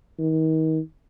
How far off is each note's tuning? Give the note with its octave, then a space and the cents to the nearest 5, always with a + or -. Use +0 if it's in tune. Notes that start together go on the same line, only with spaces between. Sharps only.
D#3 +35